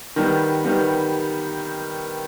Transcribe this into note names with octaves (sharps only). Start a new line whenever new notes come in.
D#3 G3 B3
D#3 G3 B3